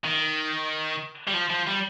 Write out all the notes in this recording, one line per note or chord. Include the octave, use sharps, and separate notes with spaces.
D#3
G3
F3
F3
G3